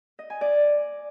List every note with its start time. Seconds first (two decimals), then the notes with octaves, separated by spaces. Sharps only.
0.19 D#5
0.30 G#5
0.41 D5